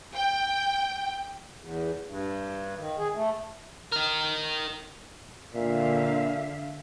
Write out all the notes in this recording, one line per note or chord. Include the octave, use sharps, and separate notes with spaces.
G5
E2
G2
D#3
G#4
A3
D#4 A#4
A#2 D3 E5 F5